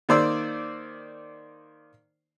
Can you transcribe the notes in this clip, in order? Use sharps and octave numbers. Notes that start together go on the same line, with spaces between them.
D#3 A#3 C5 D5 E6